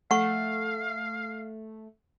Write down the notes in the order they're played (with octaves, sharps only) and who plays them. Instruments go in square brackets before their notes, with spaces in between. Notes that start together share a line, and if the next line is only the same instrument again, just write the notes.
[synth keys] A3 [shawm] F5 [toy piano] F#5 C#6